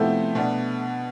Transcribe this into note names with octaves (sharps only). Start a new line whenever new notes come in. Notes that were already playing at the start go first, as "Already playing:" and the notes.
Already playing: C3 F3 A3 B3 E4 G4
B2 B3 D4